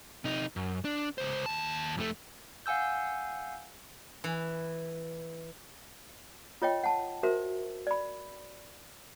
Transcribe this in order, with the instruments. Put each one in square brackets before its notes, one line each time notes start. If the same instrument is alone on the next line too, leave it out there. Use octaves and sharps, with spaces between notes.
[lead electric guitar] C3 D#4
F#2
D4
C#2 C5
D#2 A5
F2 A3
[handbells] F5 F#5 G#5 E6 G6
[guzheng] E3
[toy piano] F4 C#5 D#5 G5
F#5 A5
F#4 A#4 C5 E5
D5 B5